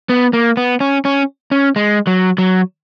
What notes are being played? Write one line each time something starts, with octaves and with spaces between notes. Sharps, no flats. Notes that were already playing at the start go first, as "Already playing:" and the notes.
B3
A#3
B3
C#4
C#4
C#4
G#3
F#3
F#3